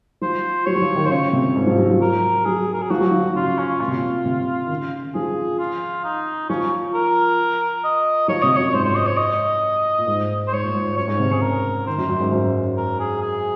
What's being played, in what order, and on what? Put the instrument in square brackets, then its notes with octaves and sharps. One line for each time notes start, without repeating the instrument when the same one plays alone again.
[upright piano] F3 [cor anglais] C5
[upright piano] F#3 [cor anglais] C#5
[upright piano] F#3
F3
D#3
[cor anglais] C5
[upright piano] C#3 [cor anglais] C#5
[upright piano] C3
G#2
F3
F#3
F#3
[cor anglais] A#4
[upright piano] F#3 [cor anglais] G#4
[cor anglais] A#4
G#4
[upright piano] F3 [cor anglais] F#4
[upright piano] F#3
F3
[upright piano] C#3 [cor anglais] F4
[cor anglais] C#4
[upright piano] A#2 [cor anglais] F4
[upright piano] C3
A#2
C3
D#3
C#3
[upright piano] F3 [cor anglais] G#4
[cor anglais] F4
D#4
[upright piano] F3 [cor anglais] C#4
[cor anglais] A#4
D#5
[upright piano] F3 [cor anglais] C#5
[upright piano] C3 [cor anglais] D#5
[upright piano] F#2 [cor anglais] C#5
[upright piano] G#2 [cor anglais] C5
[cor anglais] C5
D#5
C#5
D#5
[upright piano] A#2
G#2
[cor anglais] C5
[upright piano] G#2 [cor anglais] C#5
[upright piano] A#2
G#2
[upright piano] F#2 [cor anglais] C#5
[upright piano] G#2
C3
[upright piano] C#3 [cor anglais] G#4
[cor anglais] A#4
[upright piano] D#3 [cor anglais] C5
[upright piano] F#2
F#2
G#2
F#2
[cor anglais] A#4
G#4
G#4